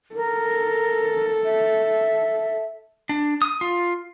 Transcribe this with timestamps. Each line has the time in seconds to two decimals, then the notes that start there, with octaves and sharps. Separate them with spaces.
0.15 A4 A#4
1.44 E5
3.09 D4
3.42 D#6
3.61 F4